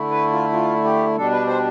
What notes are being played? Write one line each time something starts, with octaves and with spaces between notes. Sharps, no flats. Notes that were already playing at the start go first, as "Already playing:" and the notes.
Already playing: D3 A3 E4
B4
F4
F4
G4
B2 G3 D4 A4
B4
C5